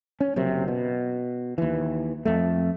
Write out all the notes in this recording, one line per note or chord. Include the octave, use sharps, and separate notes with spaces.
C#4
F#1 F#2 C3
B2
D#2 E3
F2 A3